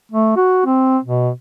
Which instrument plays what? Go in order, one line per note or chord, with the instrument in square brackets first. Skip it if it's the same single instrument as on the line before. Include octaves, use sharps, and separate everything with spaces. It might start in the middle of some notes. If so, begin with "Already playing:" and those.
[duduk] A3
F#4
C4
B2